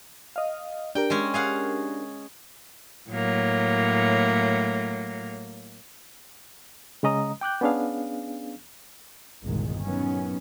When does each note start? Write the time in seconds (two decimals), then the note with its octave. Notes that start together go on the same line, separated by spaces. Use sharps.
0.36 D#5 F5
0.95 D4 G4 A#4 G5
1.10 G#3 C#4
1.34 G#4 F5 F#5
3.10 A2 F#3 A#3
7.03 C#3 G#3 C#4 D#5 A#5 D#6
7.41 G5 D6 F#6 G6
7.61 B3 C#4 D4 G#4 F5
9.44 G1 C2 A#2 D#3 G#3
9.82 D#3 F#3 B3 C#4